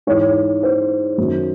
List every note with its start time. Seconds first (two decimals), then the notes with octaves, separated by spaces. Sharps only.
0.07 G#2 E3 C#5
0.63 C5
1.18 F#2 D#3 F#3